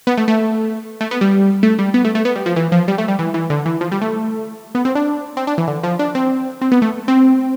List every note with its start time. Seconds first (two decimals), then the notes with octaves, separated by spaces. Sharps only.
0.07 B3
0.18 A3
0.28 A3
1.01 A3
1.11 B3
1.21 G3
1.63 A3
1.79 G3
1.94 B3
2.05 A3
2.15 A3
2.25 B3
2.36 G3
2.46 F3
2.56 E3
2.72 F3
2.88 G3
2.98 A3
3.08 G3
3.19 E3
3.34 E3
3.50 D3
3.66 E3
3.81 F3
3.92 G3
4.02 A3
4.75 B3
4.85 C4
4.95 D4
5.37 C4
5.47 D4
5.58 E3
5.68 D3
5.83 F3
5.99 D4
6.15 C4
6.61 C4
6.72 B3
6.82 A3
7.08 C4